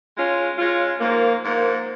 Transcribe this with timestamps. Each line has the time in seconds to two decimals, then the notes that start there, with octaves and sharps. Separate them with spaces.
0.15 G#3 C#4 F4
0.57 G#3 C#4 F4
1.00 G#2 F3 A#3
1.42 G#2 F3 A#3